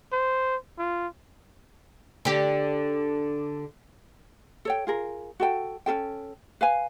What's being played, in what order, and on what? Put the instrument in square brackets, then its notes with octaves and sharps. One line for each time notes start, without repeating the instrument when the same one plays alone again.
[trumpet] C5
F4
[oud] D3 G4
[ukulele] A4 C#5 G5
F4 G#4 A#4
F#4 A4 G5
C#4 F4 A4 G5
B4 F5 G#5